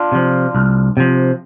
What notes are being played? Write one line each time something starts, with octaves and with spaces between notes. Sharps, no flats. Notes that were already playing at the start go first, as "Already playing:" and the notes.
Already playing: D4 F4
C3 F3
C2
C3 F3